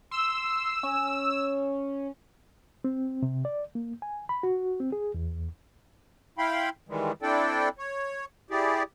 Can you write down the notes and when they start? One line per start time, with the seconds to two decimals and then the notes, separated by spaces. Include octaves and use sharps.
0.11 C6 E6
0.83 C#4
2.84 C4
3.23 C3
3.45 D5
3.75 A#3
4.02 G#5
4.29 B5
4.43 F#4
4.80 C4
4.92 G#4
5.14 E2
6.38 E4 F5 G5 B5 C6
6.89 D#3 E3 G3 G#3
7.22 C4 D4 E4 A4 D5 G5
7.78 C#5
8.51 E4 G4 G#4 D5